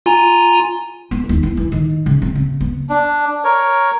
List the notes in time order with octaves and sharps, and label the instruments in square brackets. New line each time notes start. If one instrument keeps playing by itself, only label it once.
[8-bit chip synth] F4 G#5 A#5
[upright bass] B3
D#2
E3
E3
D#3
C#3
C4
C#3
B3
[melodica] D4
A#4 C#5